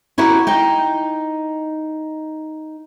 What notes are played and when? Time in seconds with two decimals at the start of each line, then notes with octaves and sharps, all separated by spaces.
0.18 C#4 E4 F#4 G4 A#4
0.47 D#4 G5